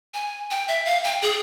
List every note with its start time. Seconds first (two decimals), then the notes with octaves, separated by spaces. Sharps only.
0.14 G#5
0.51 G5
0.68 E5
0.85 F5
1.04 G5
1.22 G#4